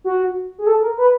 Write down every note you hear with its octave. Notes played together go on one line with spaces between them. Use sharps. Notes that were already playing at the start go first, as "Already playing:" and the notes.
F#4
G#4
A4
A#4
B4